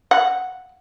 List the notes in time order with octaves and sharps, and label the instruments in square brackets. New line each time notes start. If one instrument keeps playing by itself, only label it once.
[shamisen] F#5